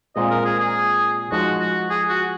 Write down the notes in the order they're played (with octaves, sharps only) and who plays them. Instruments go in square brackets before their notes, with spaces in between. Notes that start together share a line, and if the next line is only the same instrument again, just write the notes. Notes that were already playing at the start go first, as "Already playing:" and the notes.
[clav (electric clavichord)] A#2 G#3 C4 F4 [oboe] D#5
[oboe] A#4
G#4
G#4
[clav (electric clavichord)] F3 G#3 D#4 [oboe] F#4
[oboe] F#4
G#4
F#4